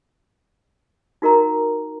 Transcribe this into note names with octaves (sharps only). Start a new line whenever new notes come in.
D#4 F#4 A#4 D#5 A#5